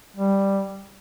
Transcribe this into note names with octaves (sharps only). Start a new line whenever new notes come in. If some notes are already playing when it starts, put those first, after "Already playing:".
G3